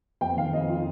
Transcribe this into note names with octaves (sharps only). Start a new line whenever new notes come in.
F2 G5
D#3 F5
F2 D#5
F4